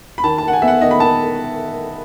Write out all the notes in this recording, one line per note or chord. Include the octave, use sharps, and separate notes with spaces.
B5
D#3 A5
A5
D#3 F#5
G#5
B3 E5
F#5
D#3 D#5
B5
D#3 A5